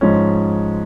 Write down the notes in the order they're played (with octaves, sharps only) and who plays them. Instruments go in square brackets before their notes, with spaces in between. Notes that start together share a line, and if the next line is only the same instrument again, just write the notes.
[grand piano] G#2 F3 G#3 C#4